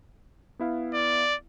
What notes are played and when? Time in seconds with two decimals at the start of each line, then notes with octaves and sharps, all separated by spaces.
0.59 B3 E4 F5
0.94 D5